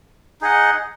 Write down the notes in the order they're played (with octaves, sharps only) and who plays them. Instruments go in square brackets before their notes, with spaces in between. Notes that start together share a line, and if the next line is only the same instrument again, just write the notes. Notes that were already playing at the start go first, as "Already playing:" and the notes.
[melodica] D#4 G#4 D#5 F#5